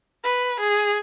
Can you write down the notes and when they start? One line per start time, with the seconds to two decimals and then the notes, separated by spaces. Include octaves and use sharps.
0.24 B4
0.60 G#4